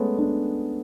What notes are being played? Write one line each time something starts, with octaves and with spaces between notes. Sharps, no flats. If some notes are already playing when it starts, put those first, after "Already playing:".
Already playing: G#3 A3 B3 C#4
B3 D4